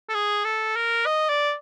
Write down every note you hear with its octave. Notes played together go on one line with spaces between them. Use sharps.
A4
G#4
A4
A#4
D#5
D5